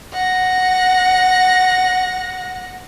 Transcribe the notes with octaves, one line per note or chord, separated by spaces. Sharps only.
F#5 A#6